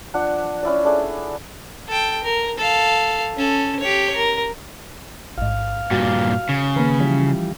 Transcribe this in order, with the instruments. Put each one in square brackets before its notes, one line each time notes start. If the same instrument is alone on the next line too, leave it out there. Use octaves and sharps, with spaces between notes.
[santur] F3 D4 F#5
C#4 E4 D5
A3 D4 G#4
[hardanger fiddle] A4 G5
A#4
A4 F5
C#4 A4
G4 C#5
A#4
[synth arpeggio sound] A1 G#2 [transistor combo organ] F5
[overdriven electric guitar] G2 A#2 [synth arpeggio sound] F#4
[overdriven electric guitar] C#3
[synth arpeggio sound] D#3 A#3 [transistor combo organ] B4
[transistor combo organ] E3 F3 G3 [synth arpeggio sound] C#4 B6